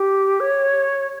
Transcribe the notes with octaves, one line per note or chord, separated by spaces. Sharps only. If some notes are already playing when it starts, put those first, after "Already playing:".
Already playing: G4
C#5